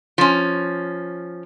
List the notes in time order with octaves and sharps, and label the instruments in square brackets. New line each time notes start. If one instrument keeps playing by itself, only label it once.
[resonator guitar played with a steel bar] F3 C#4